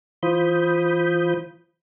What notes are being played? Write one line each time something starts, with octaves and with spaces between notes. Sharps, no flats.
E3 F4 C5 B5 D#6 G6